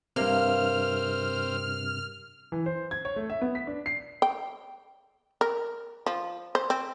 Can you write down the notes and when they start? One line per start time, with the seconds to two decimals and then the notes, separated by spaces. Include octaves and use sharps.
0.16 G2 C3 A#3 C4 F6
2.52 E3
2.66 C5
2.91 G#6
3.05 C#5
3.16 A3
3.30 E5
3.42 B3
3.55 B6
3.67 D4
3.86 C7
4.22 G5
5.41 A#4
6.06 F3
6.55 C5
6.70 C4